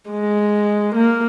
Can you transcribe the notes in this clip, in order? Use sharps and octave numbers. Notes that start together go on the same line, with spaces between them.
G#3
A#3